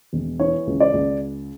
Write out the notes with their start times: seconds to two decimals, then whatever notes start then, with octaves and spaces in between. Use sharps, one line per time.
0.13 E1
0.40 E3 C#5
0.67 C#2
0.80 D5
0.93 C#2